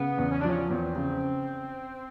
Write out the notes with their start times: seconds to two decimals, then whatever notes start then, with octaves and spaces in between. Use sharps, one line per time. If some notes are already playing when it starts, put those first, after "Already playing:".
Already playing: C#3 B3
0.18 E2
0.31 C#4
0.40 D4
0.44 F3 C#4
0.70 E2 C4
0.96 C#3